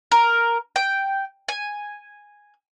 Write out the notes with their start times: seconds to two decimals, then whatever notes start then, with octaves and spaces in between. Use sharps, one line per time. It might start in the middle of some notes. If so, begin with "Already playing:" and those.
0.12 A#4
0.76 G5
1.48 G#5